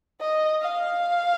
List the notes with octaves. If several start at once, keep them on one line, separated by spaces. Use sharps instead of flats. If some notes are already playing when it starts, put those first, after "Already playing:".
D#5
F5